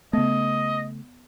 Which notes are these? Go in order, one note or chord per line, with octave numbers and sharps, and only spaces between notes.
C#3 A3 B3 D#5